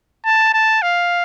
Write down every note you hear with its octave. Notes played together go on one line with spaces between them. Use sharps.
A5
A5
F5